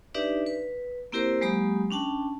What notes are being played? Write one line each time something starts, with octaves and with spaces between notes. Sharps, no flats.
D4 D#4 G4 B4 D5 E5
B4
A#3 C4 E4 G4 A#4 C5
F#3 G#3 A#3 G4 B5 D#6
C#4 D4 G5 A5